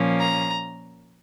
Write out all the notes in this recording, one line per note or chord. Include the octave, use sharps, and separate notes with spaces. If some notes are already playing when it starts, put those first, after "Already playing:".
Already playing: A#2 F3 A#3 C#4
A#5